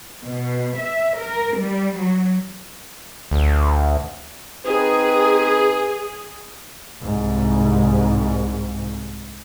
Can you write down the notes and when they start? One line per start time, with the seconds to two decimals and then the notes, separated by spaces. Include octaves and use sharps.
0.23 B2
0.78 E5
1.19 A#4
1.57 G3
1.99 F#3
3.31 D2
4.66 C4 D#4 G#4 B4
7.03 C2 G#2